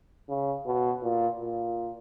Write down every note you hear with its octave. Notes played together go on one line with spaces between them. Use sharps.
C#3
B2
A#2
A#2